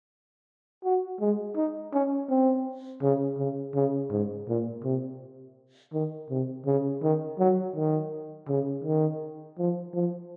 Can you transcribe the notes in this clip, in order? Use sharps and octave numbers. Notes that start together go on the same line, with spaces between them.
F#4
G#3
D#4
C#4
C4
C#3
C#3
C#3
G#2
A#2
C3
D#3
C3
C#3
D#3
F#3
D#3
C#3
D#3
F3
F3